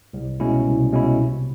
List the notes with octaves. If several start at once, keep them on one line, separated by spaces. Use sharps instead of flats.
C2
B2 G#3 C#4 E4
C2
B2 G#3 C#4 E4
C3